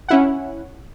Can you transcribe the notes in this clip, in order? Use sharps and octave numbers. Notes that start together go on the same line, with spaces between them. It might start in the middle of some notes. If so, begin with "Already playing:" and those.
C#4 E4 F#5